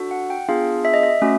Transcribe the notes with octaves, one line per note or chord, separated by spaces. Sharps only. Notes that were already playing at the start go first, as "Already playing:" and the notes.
Already playing: D4 F#4 A4
F#5
G5
B3 D4 F4 G#4 F5
E5
D#5
E5
A3 C#4 F#4